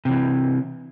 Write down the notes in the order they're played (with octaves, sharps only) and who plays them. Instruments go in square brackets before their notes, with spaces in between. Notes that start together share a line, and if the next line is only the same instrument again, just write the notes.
[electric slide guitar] C3 E3